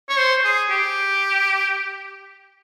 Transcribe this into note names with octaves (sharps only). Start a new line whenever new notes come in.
C#5
C5
G#4
G4